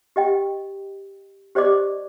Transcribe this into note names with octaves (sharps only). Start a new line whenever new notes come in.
G4 D#5 G5
G4 C5 D5 D#5 D6